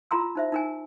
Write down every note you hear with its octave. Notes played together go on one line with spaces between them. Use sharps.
F4 A#4 A#5 C6 E6
D#4 C5 E5
D#4 A#4 G#5